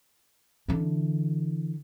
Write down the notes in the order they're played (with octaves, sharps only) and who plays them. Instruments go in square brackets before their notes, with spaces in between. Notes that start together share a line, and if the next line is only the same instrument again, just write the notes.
[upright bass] D3 E3